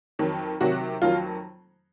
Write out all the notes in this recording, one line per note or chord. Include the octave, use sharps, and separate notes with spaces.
F2 D#3 F#3
C3 D#3 F#3 F#4
F2 D#3 F#3 F4